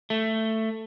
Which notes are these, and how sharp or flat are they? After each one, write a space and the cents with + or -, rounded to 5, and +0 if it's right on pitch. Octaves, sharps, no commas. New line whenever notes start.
A3 +10